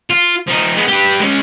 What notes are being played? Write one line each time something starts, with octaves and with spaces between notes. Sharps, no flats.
F4
F3 D#4
G#3 B3
G4 B4
G#3 C#4